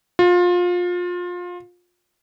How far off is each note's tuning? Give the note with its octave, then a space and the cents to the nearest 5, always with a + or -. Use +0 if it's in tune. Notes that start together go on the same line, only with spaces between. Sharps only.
F4 +25